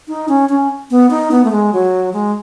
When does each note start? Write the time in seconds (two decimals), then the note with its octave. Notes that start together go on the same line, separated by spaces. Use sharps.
0.08 D#4
0.29 C#4
0.49 C#4
0.91 B3
1.10 D#4
1.31 B3
1.45 A3
1.52 G#3
1.73 F#3
2.13 G#3